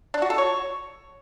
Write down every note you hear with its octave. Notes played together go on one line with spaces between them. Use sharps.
D4
F#4
A4
C#5